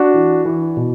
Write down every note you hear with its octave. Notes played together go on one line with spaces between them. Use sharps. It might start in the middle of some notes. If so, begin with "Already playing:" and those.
Already playing: D4 F#4
E3
E3
B2